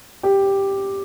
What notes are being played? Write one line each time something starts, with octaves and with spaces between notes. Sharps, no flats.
G4